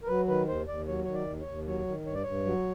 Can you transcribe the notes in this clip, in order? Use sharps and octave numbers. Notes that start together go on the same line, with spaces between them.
A#4
F#3 B4
D#3 B4
D#2 C5
D#2 D5
F#3 C#5
D#3 C#5
D5
D#2
C#5
D#2
F#3 C#5
D#3
G2 C#5
D5
G2 C#5
F#3